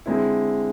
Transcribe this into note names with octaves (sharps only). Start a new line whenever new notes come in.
D3 G#3 C4 E4